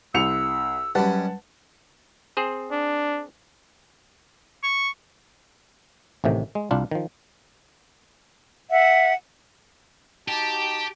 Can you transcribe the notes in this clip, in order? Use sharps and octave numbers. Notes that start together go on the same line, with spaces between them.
C2 E6 C#7 F7
F#2 G3 B4 F#5 A5
C4 G#4 C5
D4
C#6
A1 A2 C3 D#3
G#3
C2 D4 F4
D#3 F3
E5 F#5
D#4 F#4 G4 A5